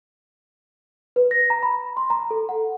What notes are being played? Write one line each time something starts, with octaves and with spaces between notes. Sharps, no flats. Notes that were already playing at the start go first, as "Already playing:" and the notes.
B4
A#6
A#5
B5
C6
A#5
A4
F#5